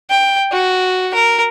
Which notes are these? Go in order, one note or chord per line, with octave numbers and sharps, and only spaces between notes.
G5
F#4
A#4